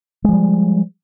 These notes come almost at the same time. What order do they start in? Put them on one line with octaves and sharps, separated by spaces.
G#3 F3 G3